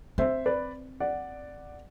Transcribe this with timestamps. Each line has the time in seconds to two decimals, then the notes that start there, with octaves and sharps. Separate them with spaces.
0.18 C4 C5 E5
0.46 B4 D5
1.00 D5 F#5